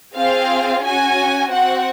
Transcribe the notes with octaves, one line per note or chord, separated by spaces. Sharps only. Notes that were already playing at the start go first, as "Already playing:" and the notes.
C4 F4 G#4 F5
C#4 F#4 G#5
C4 F#4 F#5